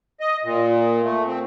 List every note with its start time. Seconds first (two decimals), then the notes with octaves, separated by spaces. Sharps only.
0.20 D#5
0.44 A#2
1.03 A3
1.26 C4